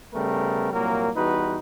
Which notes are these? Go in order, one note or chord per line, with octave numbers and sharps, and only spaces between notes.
C#3 G3 A3 B3 A#4
C2 A#2 F#3 A#3 A#4
E2 G3 D#4 F#4 B4